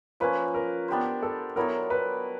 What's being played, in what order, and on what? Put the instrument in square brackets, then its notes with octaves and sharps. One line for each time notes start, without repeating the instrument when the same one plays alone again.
[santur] F3 A#3 C#4 [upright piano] B4
[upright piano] A#4
[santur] B3 D4 G4 C5
[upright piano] A4
[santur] F#3 B3 E4 A4 [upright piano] A#4
[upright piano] B4